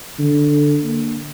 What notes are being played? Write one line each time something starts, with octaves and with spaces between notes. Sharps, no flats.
D3
A#3